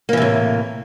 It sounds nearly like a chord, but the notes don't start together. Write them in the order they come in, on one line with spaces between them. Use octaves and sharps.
A#3 E3 C3 A2